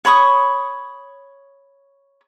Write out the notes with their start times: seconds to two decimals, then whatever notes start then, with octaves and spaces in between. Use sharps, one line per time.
0.05 C#5 B5 C#6 D#6